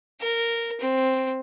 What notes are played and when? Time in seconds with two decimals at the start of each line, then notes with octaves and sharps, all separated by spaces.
0.20 A#4
0.81 C4